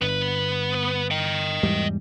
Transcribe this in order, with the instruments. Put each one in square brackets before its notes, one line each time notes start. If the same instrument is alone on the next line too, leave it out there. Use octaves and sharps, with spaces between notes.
[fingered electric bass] G1 [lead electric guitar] B3 B4
[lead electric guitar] D#5 G5
[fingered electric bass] E2 G#2 G3